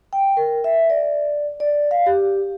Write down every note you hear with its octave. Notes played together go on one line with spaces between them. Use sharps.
G5
A#4
E5
D5
D5
F5
G4